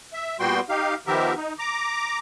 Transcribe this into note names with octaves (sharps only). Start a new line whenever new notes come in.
E5
A#2 G3 B3 F#4 G5 C6
D#4 G4 F5
D#3 F3 B3 G4 A#4 E5
D#4
A#5 D6